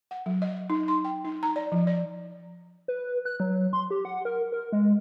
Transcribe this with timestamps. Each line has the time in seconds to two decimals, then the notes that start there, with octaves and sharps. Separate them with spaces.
0.11 F#5
0.26 F#3
0.42 D#5
0.70 D#4
0.88 C6
1.05 G5
1.25 D#4
1.43 A#5
1.56 D5
1.72 F3
1.87 D5
2.88 B4
3.25 F#6
3.40 F#3
3.73 C6
3.91 G4
4.05 F#5
4.25 A#4
4.52 A#4
4.72 G#3